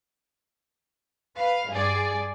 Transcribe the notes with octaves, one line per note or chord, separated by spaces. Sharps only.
B4 F5
G2 G#4 D5